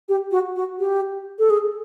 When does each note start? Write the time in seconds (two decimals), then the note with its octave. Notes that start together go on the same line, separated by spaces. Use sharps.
0.09 G4
0.31 F#4
0.56 F#4
0.79 G4
1.39 A4
1.50 G#4